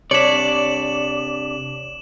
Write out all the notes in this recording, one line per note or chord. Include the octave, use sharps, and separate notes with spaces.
C3 D4 C#5 D5 B6 E7 F#7